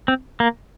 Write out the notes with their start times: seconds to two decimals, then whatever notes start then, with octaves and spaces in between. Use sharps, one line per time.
0.08 C4
0.40 A#3